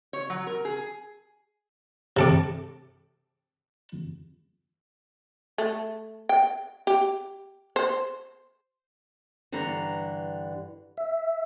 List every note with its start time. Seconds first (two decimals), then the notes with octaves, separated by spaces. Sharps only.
0.13 C#5
0.30 F#3
0.47 A#4
0.65 G#4
2.17 C3 A4 D6
5.58 A3
6.29 G5
6.87 G4
7.76 C5
9.52 G2 D3 E3 A#5
10.97 E5